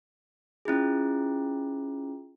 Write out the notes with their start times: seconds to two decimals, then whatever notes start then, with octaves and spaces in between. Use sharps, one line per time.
0.65 C#4 E4 F4 G#4